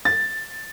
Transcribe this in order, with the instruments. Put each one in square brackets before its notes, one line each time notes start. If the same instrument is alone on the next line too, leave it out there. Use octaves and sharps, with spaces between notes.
[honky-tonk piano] A6